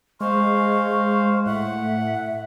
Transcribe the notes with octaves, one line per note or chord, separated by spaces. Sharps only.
G#3 C5 F5 C#6
A2 E5 F#5